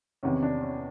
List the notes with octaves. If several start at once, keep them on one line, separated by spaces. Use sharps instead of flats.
E2 C3 D#3 C#4
D4
C#4